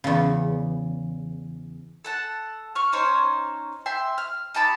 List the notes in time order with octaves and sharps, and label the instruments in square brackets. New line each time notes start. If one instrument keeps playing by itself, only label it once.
[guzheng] E2 C#3
[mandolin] A4 F#5 A5
C#6 F6
C#4 D#4 C5 C#5
E5 G5 C6
F6
D#4 G4 A5 B5